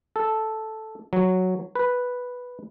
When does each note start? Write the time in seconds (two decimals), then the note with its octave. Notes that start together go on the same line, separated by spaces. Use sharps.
0.16 A4
1.13 F#3
1.75 B4